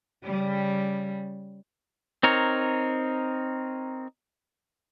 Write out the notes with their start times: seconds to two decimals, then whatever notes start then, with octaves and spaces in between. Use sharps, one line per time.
0.24 C#3 G3
2.23 C4 D#4 A#4 C#5